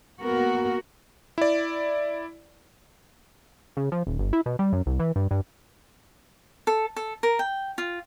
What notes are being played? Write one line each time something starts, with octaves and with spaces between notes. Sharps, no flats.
A#3 B3 F#4 A#4
E4 D5
C#3
F3
D#1
G1
E4
B2
G3
F#2
C2
E3
G2
G2
A4
A4
A#4
G5
F4